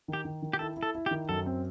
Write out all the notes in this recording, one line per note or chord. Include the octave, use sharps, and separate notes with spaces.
D#3
G4
D#3
D#3
G4
E4 A4
E4
A4
E4
G4
D#3
F#2 A4
C4